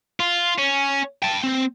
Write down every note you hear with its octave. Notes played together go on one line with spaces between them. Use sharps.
F4
C#4
G5 A5
C4